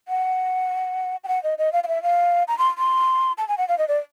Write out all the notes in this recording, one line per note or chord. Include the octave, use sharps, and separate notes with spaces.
F#5
G5
F#5
D#5
D#5
F5
F5
E5
F5
A#5
C6
C6
A5
G#5
F#5
F5
D#5
D5